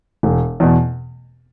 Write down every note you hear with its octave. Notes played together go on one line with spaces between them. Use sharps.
E1
E2 B2